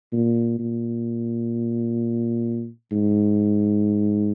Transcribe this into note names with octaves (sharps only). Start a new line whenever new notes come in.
A#2
A#2
G#2